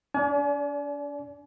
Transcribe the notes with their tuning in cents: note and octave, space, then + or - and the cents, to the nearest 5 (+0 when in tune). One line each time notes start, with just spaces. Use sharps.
D4 -45 D5 -20 G#5 +40